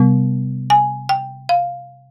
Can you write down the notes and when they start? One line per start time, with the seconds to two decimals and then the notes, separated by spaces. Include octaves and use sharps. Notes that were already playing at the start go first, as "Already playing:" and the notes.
Already playing: C3 G3 B3
0.70 G#5
1.09 G5
1.49 F5